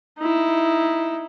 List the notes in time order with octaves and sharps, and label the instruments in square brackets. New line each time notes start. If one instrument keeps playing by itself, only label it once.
[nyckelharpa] D#4 E4